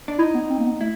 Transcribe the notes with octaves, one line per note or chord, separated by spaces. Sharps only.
D4
D#4 E4
B3
C4
A#3
B3
A3 E4